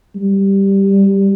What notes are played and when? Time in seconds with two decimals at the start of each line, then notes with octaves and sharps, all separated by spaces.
0.16 G3